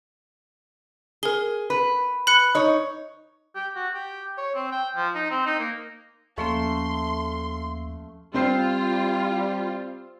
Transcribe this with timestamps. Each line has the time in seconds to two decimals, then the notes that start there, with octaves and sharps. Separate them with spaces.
1.23 G#4 A#4 G7
1.70 B4
2.27 B5 F#6 C#7
2.55 D#4 C#5
3.55 G4
3.76 F#4
3.94 G4
4.38 C#5
4.55 C4
4.71 G5
4.96 F3
5.15 D#4
5.30 C4
5.46 D#4
5.59 A#3
6.38 D#2 F3 A3 A#3 C#4 F5 C6
8.34 G3 C4 F4 C5 C7